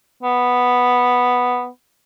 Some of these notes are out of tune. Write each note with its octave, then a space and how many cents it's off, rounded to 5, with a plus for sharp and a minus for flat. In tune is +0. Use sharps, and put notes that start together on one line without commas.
B3 +0